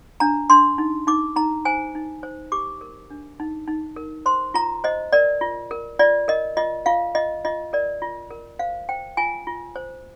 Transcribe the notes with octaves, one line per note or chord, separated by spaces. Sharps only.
D4 A#5
D4 C6
D#4
D#4 D6
D#4 A#5
C5 G#5
D#4
C5
G4 D6
A#4
D4
D#4
D#4
A#4
C5 C6
F4 A#5
C5 D#5
A#4 D5
F4
A#4
F4 D5
A#4 D#5
F4 D#5
F4 F5
F4 D#5
F4 D#5
A#4 D5
F4
A#4
C5 F5
C5 G5
F4 G#5
F4
C5